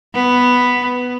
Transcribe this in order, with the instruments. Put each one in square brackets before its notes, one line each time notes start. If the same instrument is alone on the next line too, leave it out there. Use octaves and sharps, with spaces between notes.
[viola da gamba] B3